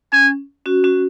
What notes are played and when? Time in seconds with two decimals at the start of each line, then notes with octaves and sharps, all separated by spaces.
0.13 C#4 G#5
0.66 C#4 F#4
0.84 C#4 F#4